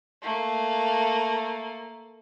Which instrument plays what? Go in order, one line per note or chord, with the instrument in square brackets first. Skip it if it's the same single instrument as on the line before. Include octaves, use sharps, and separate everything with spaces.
[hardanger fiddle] A3 A#3